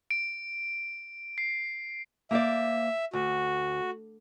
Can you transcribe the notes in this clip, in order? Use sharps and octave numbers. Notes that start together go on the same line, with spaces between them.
D7
C7
A#3 C5 D5 E5
D2 F#4